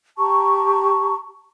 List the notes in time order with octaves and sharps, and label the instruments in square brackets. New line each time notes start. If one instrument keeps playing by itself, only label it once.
[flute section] G4 A5 A#5 C#6